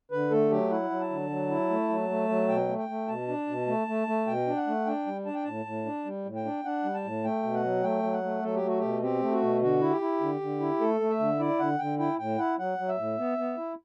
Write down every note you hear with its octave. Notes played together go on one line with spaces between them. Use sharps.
D3 B4
A3 A4
F#3 G4
E4 F#5
F#3
A5
D3
F#3
E4
A3
F#3
A3
F#3
B2 G5
A3
G5
A3
B2 A5
D4
B2
A3
A3
A3
B2 G5
D4
F#5
A3
D4 G5
G3
D4 A5
G5
A2 A5
A2
D4
G3
A2
G5
D4
D4 F#5
G3
A5
A2
A3 G5
B2
F#5
F#3
A3 G5
F#3
F#5
A3
F#3 A4
G4
A3 F#4
B2 G4
C4 G4
A3
F#4
B2
D3 F#4
E4
G4
E4
D3
D3
E4
A3 A4
A3
E5
D3
E4 D5
D3 F#5
D3 G5
E4 G5
A2 G5
E4 F#5
F#3 F#5
F#3
E5
A2
B3
B3
E4